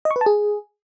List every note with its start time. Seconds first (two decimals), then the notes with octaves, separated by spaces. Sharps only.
0.05 D#5
0.11 C#6
0.16 B4
0.21 A5
0.26 G#4